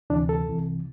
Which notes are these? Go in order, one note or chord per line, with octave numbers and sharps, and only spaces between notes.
D2 C3 E3 D4
A4
C2 C3 E3